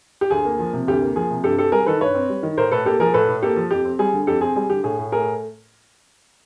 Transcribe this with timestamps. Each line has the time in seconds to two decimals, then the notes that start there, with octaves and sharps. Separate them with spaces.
0.21 G4
0.30 D2 G#4
0.45 A#3
0.59 F3
0.73 C3
0.88 D2 G4
1.02 A#3
1.16 F3 G#4
1.30 C3
1.44 G2 G4 A4
1.58 C4 G4 A4
1.72 G3 G#4 A#4
1.86 D#3 A4 B4
2.01 G2 B4 C#5
2.15 C4
2.30 G3
2.43 D#3
2.58 A2 A#4 C5
2.72 A2 A4 B4
2.85 A#3 G4 A4
3.00 F3 G#4 A#4
3.14 A2 A4 B4
3.28 A2
3.43 A#3 G4 A4
3.56 F3
3.71 F2 G4
3.85 C4
3.99 G3 G#4
4.13 D3
4.27 F2 G4 A4
4.41 C4 G#4
4.56 G3 G#4
4.70 D3 G4
4.84 A2 G#4
4.99 A2
5.12 A3 G#4 A#4